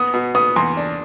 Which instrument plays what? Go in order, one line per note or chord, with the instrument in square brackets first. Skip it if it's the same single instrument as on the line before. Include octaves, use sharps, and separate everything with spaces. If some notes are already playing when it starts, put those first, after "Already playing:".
Already playing: [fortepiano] B3 [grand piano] D#6
[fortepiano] B2
[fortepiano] B3 [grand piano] D#6
[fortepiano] E2 [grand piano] C6
[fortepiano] D4